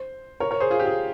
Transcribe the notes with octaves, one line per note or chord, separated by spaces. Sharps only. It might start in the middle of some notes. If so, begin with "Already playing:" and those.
Already playing: C5
A#4 C#5
A#4 C#5
G#4 C5
F4 G#4
G4
F4 G#4